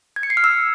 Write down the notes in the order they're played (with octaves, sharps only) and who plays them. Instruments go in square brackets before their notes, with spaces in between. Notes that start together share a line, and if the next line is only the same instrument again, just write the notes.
[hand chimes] G#6
C#7
C7
F6
E6